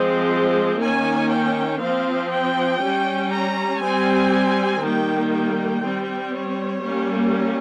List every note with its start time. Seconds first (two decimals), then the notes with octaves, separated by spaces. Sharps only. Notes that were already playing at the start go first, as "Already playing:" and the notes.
Already playing: F3 G#3 C4
0.81 D#3 A#3 C#4 G#5
1.31 G5
1.81 F3 C4 F5
2.33 G5
2.82 G3 C#4
3.32 A#5
3.83 G3 C4 G#5
4.83 D#3 G3 A#3 G5
5.33 G5
5.84 G3 C4
6.34 C#5
6.84 G3 A#3 C#4